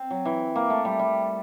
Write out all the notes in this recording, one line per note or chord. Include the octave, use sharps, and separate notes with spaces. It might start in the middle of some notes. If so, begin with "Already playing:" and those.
Already playing: C4
F#3
E3
A#3
A3
G3
G3